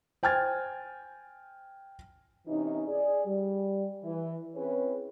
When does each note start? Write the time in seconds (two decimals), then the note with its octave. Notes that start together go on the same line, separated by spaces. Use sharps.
0.23 C5 G5 G#5 F6 G#6 A6
2.47 C3 E3 C#4 D#4
2.87 G#4 D5
3.25 G3
4.04 E3
4.55 C4 C#4 E4 G#4 B4 C#5